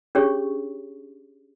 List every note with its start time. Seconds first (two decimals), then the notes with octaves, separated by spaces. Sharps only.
0.15 C#4 D4 G4 G#4 C#5 C#6